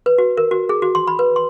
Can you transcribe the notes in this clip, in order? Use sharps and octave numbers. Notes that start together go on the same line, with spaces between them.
B4
F#4
A#4
F#4
G#4
F#4
C6
B5
B4
C6